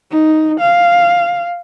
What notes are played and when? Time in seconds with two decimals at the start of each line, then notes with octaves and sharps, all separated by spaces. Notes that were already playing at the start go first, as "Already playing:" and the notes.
0.11 D#4
0.60 F5